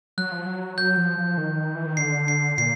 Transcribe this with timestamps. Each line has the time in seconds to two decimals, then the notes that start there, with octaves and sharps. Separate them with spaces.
0.18 F#3 F#6
0.32 F3
0.46 F#3
0.78 F#3 G6
0.97 F3
1.18 F3
1.38 D#3
1.75 E3
1.86 D#3
1.97 D3 C7
2.28 C7
2.58 A#2 C7